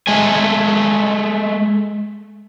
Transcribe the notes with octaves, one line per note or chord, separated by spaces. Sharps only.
G#3 A3 G#5